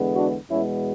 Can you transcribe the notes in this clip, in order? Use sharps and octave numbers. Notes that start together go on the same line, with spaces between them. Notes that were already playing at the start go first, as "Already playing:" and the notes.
Already playing: E2 D3 G#3 B3
D4 F#4
E2 B2 G#3 B3 C#4 E4